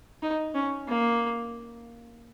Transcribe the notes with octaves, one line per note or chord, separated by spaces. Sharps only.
D#4
C#4
A#3